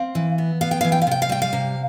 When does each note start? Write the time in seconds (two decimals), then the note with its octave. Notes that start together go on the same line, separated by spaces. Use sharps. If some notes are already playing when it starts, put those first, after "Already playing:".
Already playing: C4 F5
0.15 E3
0.38 B3
0.61 B3 F5
0.71 G5
0.81 E3 F5
0.92 G5
1.02 F5
1.07 C3 G5
1.22 F5
1.29 G3 G5
1.42 F5
1.53 C3